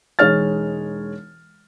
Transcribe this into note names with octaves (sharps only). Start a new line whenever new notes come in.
E1 G#3 D#4 C#5 F6 A6